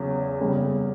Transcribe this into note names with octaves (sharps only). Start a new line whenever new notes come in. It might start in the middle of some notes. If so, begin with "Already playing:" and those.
Already playing: E2 C#3 F#3
F#1 E2 C#3 G3